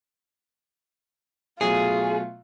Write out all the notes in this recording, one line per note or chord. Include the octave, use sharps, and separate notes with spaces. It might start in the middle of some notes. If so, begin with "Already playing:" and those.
B2 F#3 A3 F4 G#4